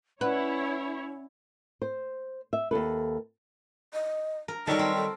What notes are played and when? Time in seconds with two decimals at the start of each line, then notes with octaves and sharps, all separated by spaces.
0.21 C#4 E4 B4 C#5 D5 F#5 B5
1.82 C5
2.53 E5
2.71 D#2 C#3 A4 B4
3.94 D#5
4.48 A#4
4.67 D#3 F#3 G3 D#4 A4 A#4
4.79 C4
4.95 A4